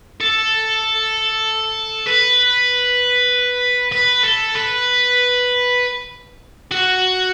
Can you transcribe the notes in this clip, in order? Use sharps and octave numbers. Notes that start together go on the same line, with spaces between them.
A4
B4
B4
A4
B4
F#4